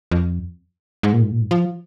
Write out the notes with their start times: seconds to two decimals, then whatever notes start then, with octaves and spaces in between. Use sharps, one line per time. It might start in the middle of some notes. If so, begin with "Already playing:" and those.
0.11 F2
1.03 G#2
1.13 A#2
1.22 G#2
1.32 A#2
1.41 G#2
1.51 F3